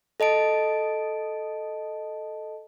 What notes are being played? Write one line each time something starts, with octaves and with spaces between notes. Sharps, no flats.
A4 D#5 A5 D7